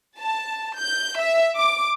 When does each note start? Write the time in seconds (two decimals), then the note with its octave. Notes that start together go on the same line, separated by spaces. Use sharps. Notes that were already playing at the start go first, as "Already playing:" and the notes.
0.17 A5
0.77 G6
1.18 E5
1.57 D6